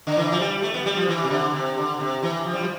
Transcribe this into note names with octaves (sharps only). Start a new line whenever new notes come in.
D3
E3
F3
G3
A3
B3
G3
F3
E3
C3
D3
C3
D3
C3
E3
F3
G3
F3